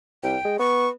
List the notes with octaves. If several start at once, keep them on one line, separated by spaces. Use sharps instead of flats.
C2 G5
G#3
B3 C#6